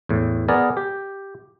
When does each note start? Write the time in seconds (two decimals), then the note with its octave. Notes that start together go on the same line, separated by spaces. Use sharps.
0.09 E2 A2
0.48 B3 G#4 A#4 D5
0.77 G4